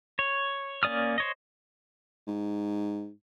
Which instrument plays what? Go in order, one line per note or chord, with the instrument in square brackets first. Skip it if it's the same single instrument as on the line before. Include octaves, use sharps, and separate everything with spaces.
[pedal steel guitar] C#5
A#3 C#4 D5 D#6 F6
C5 C#5 D#5
[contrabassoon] G#2